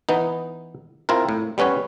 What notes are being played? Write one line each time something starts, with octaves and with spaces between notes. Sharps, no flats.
E3 B3 D#4
C4 E4 F4 A#4
A2
G3 B3 C#4 B4 C#5